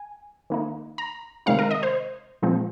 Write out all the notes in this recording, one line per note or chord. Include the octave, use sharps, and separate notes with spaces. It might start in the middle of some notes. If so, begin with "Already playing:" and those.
Already playing: G#5
D#3 A#3 D#4
A#5
C3 D#3 G#3 C4 D#4 F5
A#4
D#5
C5
A#2 F3 G#3 C4